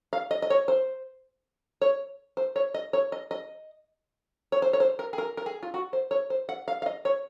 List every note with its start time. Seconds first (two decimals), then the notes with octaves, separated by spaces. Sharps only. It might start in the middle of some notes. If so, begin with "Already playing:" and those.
0.13 F5
0.31 D#5
0.42 D#5
0.50 C#5
0.68 C5
1.81 C#5
2.37 C5
2.56 C#5
2.74 D#5
2.93 C#5
3.12 D#5
3.31 D#5
4.52 C#5
4.62 C5
4.73 C#5
4.80 C5
4.99 A#4
5.13 G#4
5.18 A#4
5.37 A#4
5.46 G#4
5.63 F4
5.74 F#4
5.93 C5
6.11 C#5
6.30 C5
6.49 F#5
6.68 F5
6.82 F5
6.86 D#5
7.05 C#5